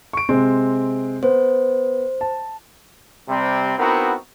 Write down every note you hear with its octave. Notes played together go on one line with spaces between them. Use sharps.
C#6 D7
C3 G#3 C4
B3 C5
A5
C3 G3 C4
B3 C4 D#4 E4 F#4 A#4